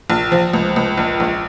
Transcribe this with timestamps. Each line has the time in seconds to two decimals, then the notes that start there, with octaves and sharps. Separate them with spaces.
0.10 A#1
0.32 F3
0.53 C#2
0.76 C#2
0.98 A#1
1.20 A#1